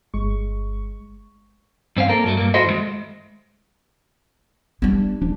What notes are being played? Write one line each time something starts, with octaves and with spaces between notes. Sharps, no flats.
G1 G#3 C#6
G2 C4 C#4 F5
A#3 A4 A#4
G2 F#3 A3
G2 A#3
E4 F#4 A4 C5 D#5 E5
D#2 G#3
G3 B3 D4
D#1 F3 D4